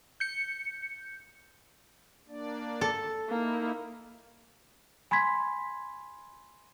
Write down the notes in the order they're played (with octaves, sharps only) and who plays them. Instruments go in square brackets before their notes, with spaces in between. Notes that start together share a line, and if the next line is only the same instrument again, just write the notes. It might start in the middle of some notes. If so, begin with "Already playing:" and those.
[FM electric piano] G6 C#7
[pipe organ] A#3 D4 D5
[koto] A4
[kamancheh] A#3 [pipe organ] D#4 E4
[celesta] G#5 B5 C6 G#6 B6